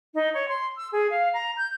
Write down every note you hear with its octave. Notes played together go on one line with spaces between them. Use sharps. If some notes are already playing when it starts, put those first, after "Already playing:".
D#4
C#5
C6
E6
G#4
F5
A#5
G6